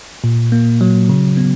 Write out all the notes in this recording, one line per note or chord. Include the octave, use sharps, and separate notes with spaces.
A#2
A#3
F#3
C#3
B3